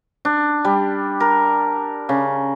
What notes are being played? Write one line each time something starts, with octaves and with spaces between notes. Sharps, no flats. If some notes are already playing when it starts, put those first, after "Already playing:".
D4
G3
A#4
C#3